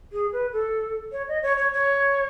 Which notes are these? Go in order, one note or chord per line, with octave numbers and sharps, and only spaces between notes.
G#4
B4
A4
C#5
D#5
C#5
C#5
C#5